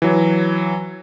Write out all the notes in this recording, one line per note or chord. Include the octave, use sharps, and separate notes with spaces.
E3 F#3